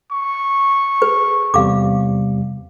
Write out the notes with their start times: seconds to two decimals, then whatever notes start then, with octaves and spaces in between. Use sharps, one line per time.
0.11 C#6
1.02 G#4 B4
1.54 E2 C3 G3 F5 D6